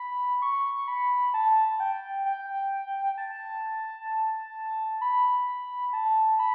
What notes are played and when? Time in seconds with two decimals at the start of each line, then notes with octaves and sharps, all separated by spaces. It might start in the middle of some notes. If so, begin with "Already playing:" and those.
Already playing: B5
0.42 C#6
0.88 B5
1.34 A5
1.80 G5
2.26 G5
3.18 A5
5.01 B5
5.93 A5
6.39 B5